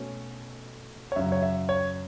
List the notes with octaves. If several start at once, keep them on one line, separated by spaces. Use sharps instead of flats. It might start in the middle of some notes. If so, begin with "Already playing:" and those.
Already playing: B2 A3 C#4
C#5
F#2 C#3 F#3 E5
C#5
E5
C#5